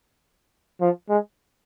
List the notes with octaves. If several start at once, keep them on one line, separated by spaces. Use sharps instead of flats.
F3
G#3